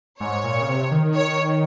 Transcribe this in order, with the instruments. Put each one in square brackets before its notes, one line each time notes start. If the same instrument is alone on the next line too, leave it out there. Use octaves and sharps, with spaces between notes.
[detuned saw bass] G#2 [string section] C#5
[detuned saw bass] A#2
C#3
C3
D#3
[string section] C#5